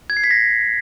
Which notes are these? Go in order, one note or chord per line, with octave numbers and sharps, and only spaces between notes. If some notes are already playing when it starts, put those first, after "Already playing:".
G#6
C7
B6
A#6